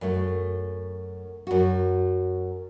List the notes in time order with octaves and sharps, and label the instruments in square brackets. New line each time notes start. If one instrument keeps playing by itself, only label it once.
[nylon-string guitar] F#2 A3
F#2 F#4